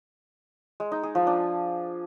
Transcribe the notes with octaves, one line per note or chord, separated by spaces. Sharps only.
G#3
D#4
G#4
F3
D4